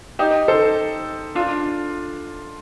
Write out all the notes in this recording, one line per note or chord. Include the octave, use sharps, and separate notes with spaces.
D#4 G4
A4 C5
D4 F4